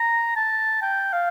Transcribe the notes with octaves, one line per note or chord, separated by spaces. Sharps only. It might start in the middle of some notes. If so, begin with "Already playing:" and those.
Already playing: A#5
A5
G5
F5